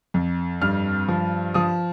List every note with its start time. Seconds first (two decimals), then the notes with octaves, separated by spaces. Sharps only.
0.14 F2
0.62 G2 F6
1.08 F3
1.54 F3 D#6